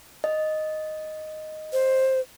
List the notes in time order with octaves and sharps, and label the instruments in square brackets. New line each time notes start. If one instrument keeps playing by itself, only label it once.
[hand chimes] D#5
[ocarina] C5